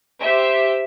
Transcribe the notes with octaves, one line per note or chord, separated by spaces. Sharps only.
G4 C5 E5